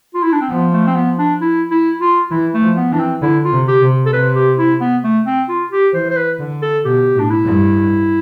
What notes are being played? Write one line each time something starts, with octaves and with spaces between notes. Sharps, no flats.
F4
E4
D4
C4
F3 B3
A3
C4
B3
D4
E4
E4
F4
E3 E4
A3
F3
B3
E3 D4
C4
D3 E4
F4
C3
G4
C3
A4
C3 B4
G4
E4
B3
A3
C4
F4
G4
E3 C5
C5
B4
D3
A4
B2 G4
A2
D4
E4
G2